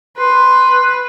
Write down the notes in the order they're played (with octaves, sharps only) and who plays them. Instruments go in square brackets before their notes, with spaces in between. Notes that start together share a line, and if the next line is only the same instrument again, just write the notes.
[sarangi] B4 [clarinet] C6